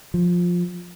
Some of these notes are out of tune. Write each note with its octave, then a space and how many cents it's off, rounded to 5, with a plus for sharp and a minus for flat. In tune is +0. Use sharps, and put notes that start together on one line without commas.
F3 +10